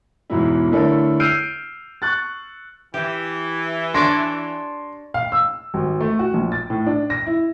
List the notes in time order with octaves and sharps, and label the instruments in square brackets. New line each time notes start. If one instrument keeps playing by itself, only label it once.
[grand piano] E2 G#2 B2 F#3 E4
D3 A3 E4 A4 A#4 C#5
E6 F6 G6 C7 D7 D#7
C#6 F#6 A6
[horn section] E3 [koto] G4
[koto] D4 C#5 D5 [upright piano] C6 A#6
[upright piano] F5
E6
G#1
A3
F#4
A#1
A6
A2
D4
A#6
E4